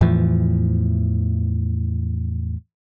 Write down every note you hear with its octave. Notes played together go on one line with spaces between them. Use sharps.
E2 A2 E3 F3